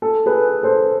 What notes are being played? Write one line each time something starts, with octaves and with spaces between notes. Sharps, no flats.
A4
G#4 B4
A4 C5